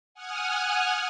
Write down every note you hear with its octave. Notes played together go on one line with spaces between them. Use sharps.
F#5 G#5 D#6 F6